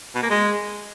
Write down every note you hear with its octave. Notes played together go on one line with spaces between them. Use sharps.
B2
A#3
G#3